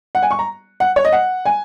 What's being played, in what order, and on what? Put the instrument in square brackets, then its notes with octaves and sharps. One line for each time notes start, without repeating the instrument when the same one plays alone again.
[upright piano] F#5
G#5
C#6
A#5
F#5
C#5
D#5
F#5
G#5